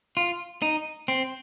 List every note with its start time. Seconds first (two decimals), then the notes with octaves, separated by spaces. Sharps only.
0.17 F4
0.62 D#4
1.08 C4